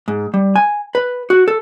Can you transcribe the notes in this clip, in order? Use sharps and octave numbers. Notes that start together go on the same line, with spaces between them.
G#2
G3
G#5
B4
F#4
A4